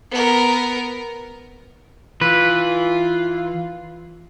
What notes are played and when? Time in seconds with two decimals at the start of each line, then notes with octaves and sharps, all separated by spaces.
0.11 B3 A#4
2.21 E3 F4 B4